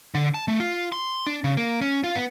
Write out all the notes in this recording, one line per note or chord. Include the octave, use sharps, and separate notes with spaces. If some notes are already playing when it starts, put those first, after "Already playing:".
D3
A5
A3
F4
C6
D4
C#3
A#3
C#4
F4
B3